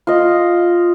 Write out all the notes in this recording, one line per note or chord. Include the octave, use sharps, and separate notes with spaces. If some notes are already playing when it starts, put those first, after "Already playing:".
F4 D#5